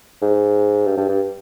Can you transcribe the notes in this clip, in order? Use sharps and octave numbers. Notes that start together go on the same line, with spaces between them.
G#2
G2
G2
G2